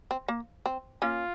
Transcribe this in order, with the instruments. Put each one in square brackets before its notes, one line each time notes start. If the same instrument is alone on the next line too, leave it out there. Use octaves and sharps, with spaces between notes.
[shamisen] C4
A#3
C4
[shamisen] A#3 C#4 [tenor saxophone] F4